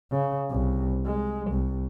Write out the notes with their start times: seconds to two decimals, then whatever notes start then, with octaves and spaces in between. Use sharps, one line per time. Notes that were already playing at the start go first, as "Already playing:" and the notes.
0.11 C#3
0.50 C2
1.05 G#3
1.51 C2